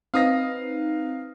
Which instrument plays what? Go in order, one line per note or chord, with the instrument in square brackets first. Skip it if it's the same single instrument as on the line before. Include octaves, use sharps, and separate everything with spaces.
[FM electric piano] C4 D#4 B4 [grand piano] F5 D#6 A#6